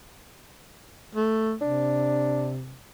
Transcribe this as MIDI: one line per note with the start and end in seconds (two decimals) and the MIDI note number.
1.15 1.54 57
1.62 2.77 48
1.62 2.51 62